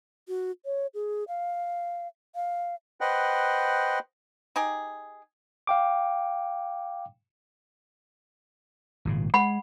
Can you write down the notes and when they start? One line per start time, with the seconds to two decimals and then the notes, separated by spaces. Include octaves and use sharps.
0.28 F#4
0.65 C#5
0.94 G#4
1.28 F5
2.35 F5
3.01 B4 C5 D#5 F#5 G5
4.56 D#4 G4 G#4
5.67 F5 G5 D6
9.05 G#1 A#2 C#3
9.34 G#3 F#5 B5